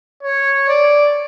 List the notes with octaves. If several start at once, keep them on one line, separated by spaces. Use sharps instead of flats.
C#5
D5